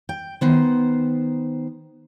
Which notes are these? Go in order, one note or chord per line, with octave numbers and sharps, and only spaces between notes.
G5
D#3 B3 C5